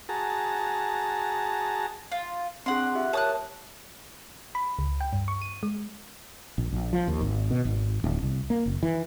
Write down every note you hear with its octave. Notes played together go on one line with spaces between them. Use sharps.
F#4 G#4 A5 A#5
F4
C4 D4 G#4 F#5 C6
F4 G4 E5
A#4 C#5 A5 D#6 F#6
B5
C#2
G5
G2
C#6
D#7
G#3
A#1
A#1
F3
D#2
G#1
B2
G#1
D1
C2
A#3
F#1
E3